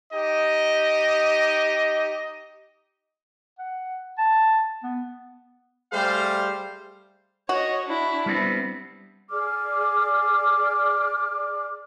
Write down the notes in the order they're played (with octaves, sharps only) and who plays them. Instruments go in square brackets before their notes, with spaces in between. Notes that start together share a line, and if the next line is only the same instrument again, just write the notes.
[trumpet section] D#4 G4 D#5
[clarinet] F#5
A5
B3
[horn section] G3 A3 G#4 C5 F5
[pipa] F#4 [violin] C#5 D#5
[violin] D4 E4
[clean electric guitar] G3 B3 C4
[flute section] G#4 D5 D6 F6